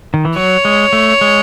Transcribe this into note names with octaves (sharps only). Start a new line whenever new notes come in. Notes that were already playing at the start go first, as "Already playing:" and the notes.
D#3
E3
F#3 C#5
G#3
A3
G#3